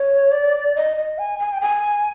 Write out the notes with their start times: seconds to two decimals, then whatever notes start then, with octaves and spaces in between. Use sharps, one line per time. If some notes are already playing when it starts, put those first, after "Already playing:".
Already playing: C#5
0.32 D5
0.76 D#5
0.97 D#5
1.18 G#5
1.39 G#5
1.53 G5
1.61 G#5